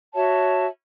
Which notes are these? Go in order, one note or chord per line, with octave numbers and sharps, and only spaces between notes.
F#4 C#5 E5 A5